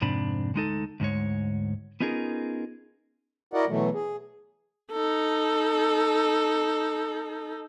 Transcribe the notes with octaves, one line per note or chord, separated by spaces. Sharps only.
F2 G#2 C3 D4 B5
D2 G#3 D#4 A4
D2 G#2 G#3 C#5
B3 C#4 D#4 F4 G#4 A#4
E4 F#4 A#4 D5 D#5 F#5
B2 E3 F#3 A3
G#4
D#4 A4